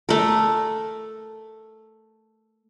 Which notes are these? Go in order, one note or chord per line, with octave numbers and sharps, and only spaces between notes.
A3 A#4